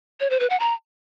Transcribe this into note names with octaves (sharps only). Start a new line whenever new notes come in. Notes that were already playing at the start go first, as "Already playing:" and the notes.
C#5
C5
B4
F#5
A#5